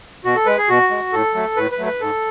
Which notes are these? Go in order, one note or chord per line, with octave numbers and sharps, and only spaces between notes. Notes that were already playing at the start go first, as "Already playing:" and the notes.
B2 F#4
A4
G#3 B4
G#4
B2 F#4
G#3
A2 A4
F#3 A3
A2 B4
B4
F#3 A3
B4
G#2 A4